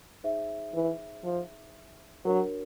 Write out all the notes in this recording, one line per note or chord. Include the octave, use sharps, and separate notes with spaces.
D#4 G#4 C5 E5
E3
F3
F#3 D4 F#4 A#4 C#5